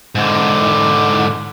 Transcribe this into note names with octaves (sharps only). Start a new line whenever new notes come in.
G#2 D3